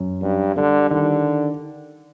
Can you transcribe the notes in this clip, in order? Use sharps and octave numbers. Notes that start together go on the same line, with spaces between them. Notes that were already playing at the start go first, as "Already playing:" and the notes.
Already playing: F#2
G2 G3
D3 G3
D3 D#3